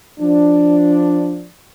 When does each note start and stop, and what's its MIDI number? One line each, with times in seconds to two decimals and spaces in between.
0.20 1.48 53
0.20 1.48 62